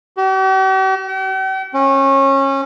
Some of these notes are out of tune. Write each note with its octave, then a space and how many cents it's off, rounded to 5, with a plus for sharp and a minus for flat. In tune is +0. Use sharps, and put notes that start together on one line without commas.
G4 -45
G5 -45
C#4 -25